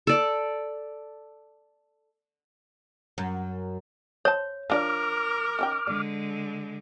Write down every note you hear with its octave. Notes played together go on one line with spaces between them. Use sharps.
A4 D5
F#2
C5 C#5 A5
F3 D4 A#4 D5 D6 F6
D#3 C#4 G5
D3 G#3 D5